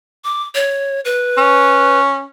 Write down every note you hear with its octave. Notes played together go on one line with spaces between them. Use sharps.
D6
C#5
B4
C#4